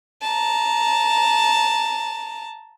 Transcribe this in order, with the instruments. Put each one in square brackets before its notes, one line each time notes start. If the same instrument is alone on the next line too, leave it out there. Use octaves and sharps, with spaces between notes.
[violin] A5 A#5